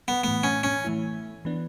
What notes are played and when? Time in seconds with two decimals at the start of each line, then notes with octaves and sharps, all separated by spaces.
0.08 B3
0.23 A2 E3 A3 B3
0.44 C#4
0.64 C#4
0.84 E3 A3 E4
1.45 E3 B3 D4